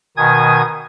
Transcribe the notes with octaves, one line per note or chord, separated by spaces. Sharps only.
B2 D#3 G#5 D#6 G#6